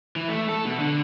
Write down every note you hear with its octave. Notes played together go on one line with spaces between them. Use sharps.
E3
A3
A4
B2
D3